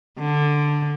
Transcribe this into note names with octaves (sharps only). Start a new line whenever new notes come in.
D3